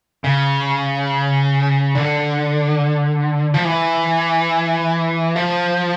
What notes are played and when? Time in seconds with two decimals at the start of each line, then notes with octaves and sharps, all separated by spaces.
0.24 C#3
1.95 D3
3.54 F3
3.65 E3
5.36 F3